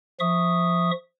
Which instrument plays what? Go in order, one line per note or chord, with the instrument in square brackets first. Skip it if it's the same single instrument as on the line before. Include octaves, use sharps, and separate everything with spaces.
[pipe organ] F3 E5 C#6 D#6